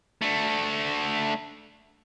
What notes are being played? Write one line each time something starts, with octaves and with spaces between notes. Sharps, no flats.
D3 A3